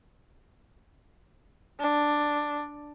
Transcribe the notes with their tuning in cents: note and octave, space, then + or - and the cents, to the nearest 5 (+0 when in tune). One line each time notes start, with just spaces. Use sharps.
D4 +5